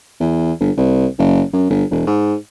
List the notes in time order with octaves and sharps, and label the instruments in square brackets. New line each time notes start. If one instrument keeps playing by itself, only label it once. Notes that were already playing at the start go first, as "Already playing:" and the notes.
[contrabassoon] E2
G1
C2
F#1
F#2
G1
E1
G#2